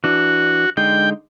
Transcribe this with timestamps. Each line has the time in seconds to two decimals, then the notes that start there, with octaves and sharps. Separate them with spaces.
0.04 E3 D4 F#4
0.77 D3 G#3 D#4 G5